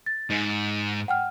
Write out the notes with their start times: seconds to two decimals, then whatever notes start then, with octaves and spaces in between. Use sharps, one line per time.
0.06 A6
0.30 G#2
1.08 F#5 G5 F6